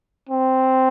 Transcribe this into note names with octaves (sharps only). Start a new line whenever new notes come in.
C4